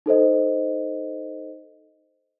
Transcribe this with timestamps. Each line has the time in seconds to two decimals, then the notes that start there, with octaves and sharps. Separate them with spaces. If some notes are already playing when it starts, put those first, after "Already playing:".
0.06 D#4 A4 C5 D#5